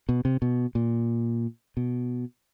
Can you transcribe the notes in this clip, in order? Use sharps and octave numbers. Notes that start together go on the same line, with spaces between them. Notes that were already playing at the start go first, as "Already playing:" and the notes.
B2
C3
B2
A#2
B2